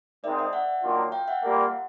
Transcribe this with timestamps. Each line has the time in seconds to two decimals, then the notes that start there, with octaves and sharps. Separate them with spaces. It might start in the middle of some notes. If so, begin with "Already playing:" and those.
0.24 G#2 D#3 G#3 C4 D#4 D5 E5
0.38 D5 E5
0.53 E5 F#5
0.83 D#3 F#3 A#3 D4 F4
1.12 F5 G5
1.28 E5 F#5
1.43 A#2 G3 A#3